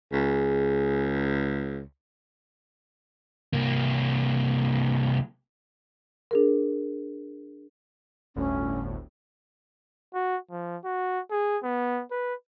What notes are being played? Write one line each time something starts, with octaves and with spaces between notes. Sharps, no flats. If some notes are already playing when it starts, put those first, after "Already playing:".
C#2 G#4
C2 A#3
D4 G#4 A#4
G1 D2 A2 C#4
F#4
F3
F#4
G#4
B3
B4